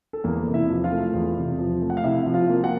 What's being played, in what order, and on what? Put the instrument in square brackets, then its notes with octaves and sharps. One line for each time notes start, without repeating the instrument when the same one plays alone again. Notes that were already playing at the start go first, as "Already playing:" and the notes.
[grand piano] A4
E2 A#3 A#4
C3
E4 E5
F3
F4 F5
A3
E2
C3
F3
A3
F#5
F5
C3 E4 E5
F3
F4 F5
A#3
F#4 F#5